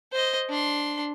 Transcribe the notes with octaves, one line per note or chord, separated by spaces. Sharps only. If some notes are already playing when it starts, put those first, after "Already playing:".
C5 D#5
D4 C6